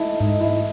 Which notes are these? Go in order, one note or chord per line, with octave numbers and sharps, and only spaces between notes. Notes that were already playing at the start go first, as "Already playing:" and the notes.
Already playing: D#4 E4 A4
G#2 D#4
E4